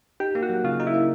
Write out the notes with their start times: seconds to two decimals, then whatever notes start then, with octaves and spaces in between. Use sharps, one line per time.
0.20 D#4 G4
0.35 A#3
0.43 F#4
0.50 F#3
0.64 C#3 F4
0.80 D#4
0.87 E4
0.94 A#3